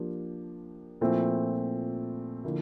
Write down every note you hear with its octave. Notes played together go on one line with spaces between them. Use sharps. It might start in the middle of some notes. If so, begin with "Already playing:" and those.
Already playing: F3 A#3 D4 G4
A#2 F3 A3 C4 E4
D3 F3 A#3 E4